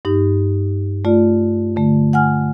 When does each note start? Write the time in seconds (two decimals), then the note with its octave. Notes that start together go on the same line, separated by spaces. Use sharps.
0.05 G2 D#4 G4
1.05 A3 F4 D5
1.76 D3 A3
2.13 F#5 G#5 F6